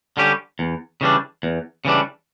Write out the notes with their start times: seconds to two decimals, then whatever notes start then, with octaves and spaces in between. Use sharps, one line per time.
0.17 D3 G3 C#4 G4
0.59 E2
1.01 C#3 E3 G3 D4
1.43 E2
1.85 C#3 E3 G3 D4